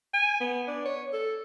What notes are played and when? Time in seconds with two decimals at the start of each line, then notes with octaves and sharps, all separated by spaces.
0.14 G#5
0.40 B3
0.68 D4
0.85 C#5
1.13 A4